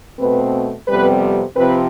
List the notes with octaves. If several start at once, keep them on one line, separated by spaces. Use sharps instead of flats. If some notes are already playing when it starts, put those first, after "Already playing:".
B2 A3 C4 B4
F2 C3 G3 B3 B4
C3 F3 C4 B4